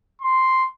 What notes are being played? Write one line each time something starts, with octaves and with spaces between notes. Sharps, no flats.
C6